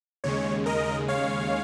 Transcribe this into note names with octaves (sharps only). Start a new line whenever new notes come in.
D#2 C#3 G#3 C#5
A#4 D#5
C#5 F5